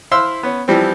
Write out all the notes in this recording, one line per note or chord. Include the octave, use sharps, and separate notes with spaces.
E4 C5 F5 C6 E6
B3 C#4
E3 F3 G3 C4